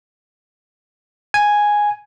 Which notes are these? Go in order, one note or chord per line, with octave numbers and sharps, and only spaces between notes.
G#5